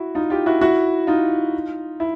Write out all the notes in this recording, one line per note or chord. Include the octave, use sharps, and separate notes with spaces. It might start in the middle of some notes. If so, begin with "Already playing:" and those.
Already playing: E4 F#4
D#4 F4
F4 G4
E4 F#4
E4 F#4
D#4 F4
E4